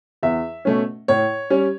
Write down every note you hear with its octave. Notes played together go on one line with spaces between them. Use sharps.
E2 E5
B2 A3 C#4
A2 C#5
G3 C#4